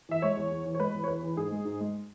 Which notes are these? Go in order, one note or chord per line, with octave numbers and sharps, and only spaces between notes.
E3 E5
G#3 C#5
E2
E2
E3
C#5
G#3 B4
E2
C#5
E2 B4
E3
G#2 G#4
G#3
G#2
G#3